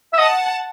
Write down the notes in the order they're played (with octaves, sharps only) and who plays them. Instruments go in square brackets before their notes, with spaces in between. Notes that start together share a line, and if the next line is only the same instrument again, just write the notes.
[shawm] E5
[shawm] D#5 [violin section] F#5 A5